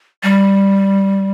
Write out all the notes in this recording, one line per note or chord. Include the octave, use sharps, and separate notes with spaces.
G3